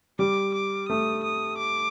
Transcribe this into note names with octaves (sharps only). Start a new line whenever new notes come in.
G3 D6
D6
A3 D#6
D#6
D6